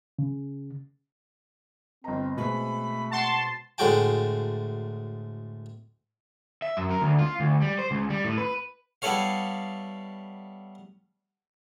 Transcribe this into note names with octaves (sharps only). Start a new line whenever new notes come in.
C#3
G1 C4 D#5 A#5
B2 G#3 A3 C4 B5
F#5 A5 C6
D2 A2 G#3 F#4 G5 A5
E5
F#2
A#4
D2
F4
D2
G3
C5
C#2
G3
A2
B4
G3 B3 E4 A4 C#5 F5